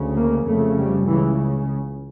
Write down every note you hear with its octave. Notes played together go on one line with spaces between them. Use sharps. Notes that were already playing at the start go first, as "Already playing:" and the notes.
Already playing: D2 C#3
A#3
F2 C#3 A3
G3
C#2 C#3 E3